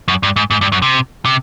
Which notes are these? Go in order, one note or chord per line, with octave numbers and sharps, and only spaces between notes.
F#2
G2
G#2
G#2
G2
F#2
C3
C3